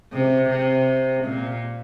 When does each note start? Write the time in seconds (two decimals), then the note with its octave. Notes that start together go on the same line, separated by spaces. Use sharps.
0.12 C3
0.50 C3
1.24 A#2